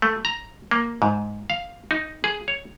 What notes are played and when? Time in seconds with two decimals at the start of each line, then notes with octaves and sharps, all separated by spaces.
0.02 A3
0.25 A#5
0.71 A#3
1.02 G#2
1.50 F5
1.91 D#4
2.24 G#4
2.48 C#5